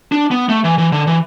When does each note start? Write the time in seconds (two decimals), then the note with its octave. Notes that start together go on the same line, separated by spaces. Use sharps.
0.12 D4
0.31 B3
0.49 A3
0.64 E3
0.78 E3
0.92 D3
1.07 E3